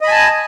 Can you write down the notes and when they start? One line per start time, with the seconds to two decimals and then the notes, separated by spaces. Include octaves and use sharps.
0.01 D#5
0.04 B5
0.08 G#5
0.11 A5